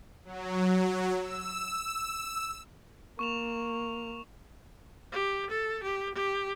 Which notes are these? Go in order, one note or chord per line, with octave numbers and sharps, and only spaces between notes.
F#3
E6
A#3 C#6 E7 F7
G4
A4
G4
G4